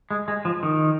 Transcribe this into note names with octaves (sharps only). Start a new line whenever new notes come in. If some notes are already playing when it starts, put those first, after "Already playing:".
G#3
G#3
F3
D#3